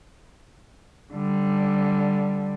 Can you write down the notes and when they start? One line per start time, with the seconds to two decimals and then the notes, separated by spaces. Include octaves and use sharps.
1.14 D3 G3